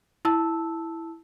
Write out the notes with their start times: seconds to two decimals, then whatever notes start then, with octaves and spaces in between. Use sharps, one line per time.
0.25 E4 A5 E6